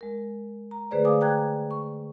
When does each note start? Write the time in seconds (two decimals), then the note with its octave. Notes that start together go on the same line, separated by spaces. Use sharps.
0.01 G#3 A#4
0.71 A#5
0.91 D3 A3 G#4 B4 C5 D5
1.05 D5 F5 G#5 D6 D#6
1.21 G5 A#5 F#6 G#6
1.71 C#6